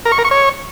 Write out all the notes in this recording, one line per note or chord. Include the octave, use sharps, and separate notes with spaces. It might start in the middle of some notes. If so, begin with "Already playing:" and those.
A#4
C#6
A#4
C#6
C#5